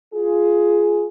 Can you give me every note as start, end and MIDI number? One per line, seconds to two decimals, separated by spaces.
0.14 1.07 65
0.14 1.07 68